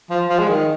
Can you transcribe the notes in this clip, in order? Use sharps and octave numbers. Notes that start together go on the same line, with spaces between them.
F3
F3
G#3
D#3